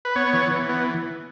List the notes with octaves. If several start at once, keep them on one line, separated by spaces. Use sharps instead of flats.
B4
B3 C#5
E3
E3
B3